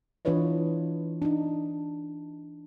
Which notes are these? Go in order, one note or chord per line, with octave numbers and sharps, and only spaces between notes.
E3 D4 F4 B4 C#5 D#5
D4 D#4